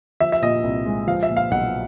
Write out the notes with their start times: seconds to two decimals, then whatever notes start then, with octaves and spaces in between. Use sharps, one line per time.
0.20 F3 E5
0.32 E5
0.42 A#2 D#5
0.64 C2
0.86 G#3
1.07 F3 F5
1.23 E5
1.29 A#2
1.37 F5
1.51 B1 F#5